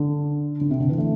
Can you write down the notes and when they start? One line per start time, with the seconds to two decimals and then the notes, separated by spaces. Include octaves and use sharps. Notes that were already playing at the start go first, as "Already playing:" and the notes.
Already playing: D3
0.61 D3
0.71 C3
0.80 D3
0.89 E3
0.98 A3